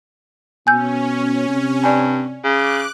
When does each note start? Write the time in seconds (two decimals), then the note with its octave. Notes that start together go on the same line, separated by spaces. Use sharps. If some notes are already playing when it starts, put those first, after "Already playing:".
0.67 B2 C#4 G#5 E6 G6
1.49 C3
1.84 G2 D5 G#5
2.44 C#3 D6 F#6